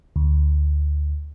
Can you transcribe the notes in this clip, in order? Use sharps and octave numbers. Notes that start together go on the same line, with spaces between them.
D2